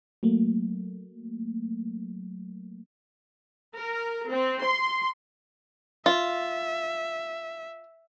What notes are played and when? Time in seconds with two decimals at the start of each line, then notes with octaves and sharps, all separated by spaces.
0.23 F#3 A3 A#3
3.75 A#4
4.30 C4
4.62 C6
6.06 F4 E5